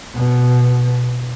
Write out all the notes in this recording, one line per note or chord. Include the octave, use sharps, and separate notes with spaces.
B2